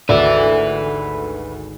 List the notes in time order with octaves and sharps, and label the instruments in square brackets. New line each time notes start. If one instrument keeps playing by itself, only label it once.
[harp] G#1 A4 [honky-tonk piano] D2 [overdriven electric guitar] B4 E5 [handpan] D5